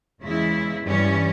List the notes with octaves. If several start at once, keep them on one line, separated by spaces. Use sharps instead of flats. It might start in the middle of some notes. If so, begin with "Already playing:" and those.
E2 C#3 E3 G#3 E4
G2 E3 G3 C#4